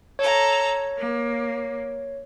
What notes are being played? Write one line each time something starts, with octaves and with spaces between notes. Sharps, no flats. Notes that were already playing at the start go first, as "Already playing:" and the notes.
A4 C#5 A#5
A#3